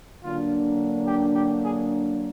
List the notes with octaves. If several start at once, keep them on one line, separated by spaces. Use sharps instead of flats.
D3 F#3 A#3 D4 F4
G4
G4
G#4